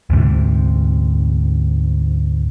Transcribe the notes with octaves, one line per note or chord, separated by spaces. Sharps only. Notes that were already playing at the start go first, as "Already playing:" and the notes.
D2 G#2 C3